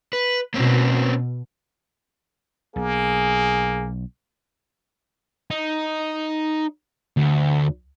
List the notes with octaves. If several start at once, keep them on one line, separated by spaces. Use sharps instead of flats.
B4
B2 A#3 C4 C#4
B1 A#3 G#4
D#4
D2